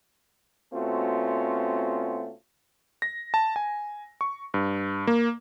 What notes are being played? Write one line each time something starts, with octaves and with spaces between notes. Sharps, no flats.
B2 A3 C4 C#4 F4 F#4
A#6
A5
G#5
C#6
G2
A#3